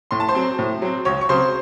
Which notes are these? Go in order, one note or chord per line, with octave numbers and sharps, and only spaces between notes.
A2 C6
A5
C5 C6
F#3 C4
A2
F#3 C4
C#2 C#5 C#6
C#6
C#3 F#3 C4 C5 C6